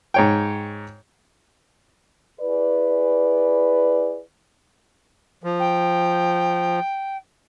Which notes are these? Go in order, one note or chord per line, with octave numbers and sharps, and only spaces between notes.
G#2 C#5 G5
E4 G#4 B4 D5
F3
G5